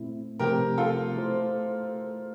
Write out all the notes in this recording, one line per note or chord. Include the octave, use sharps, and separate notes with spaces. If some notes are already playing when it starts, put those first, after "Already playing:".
Already playing: A#2 A3 C4 E4
C3 F3 A3 C4 G4 A#4
F4 A4
A3 E4 A4 C5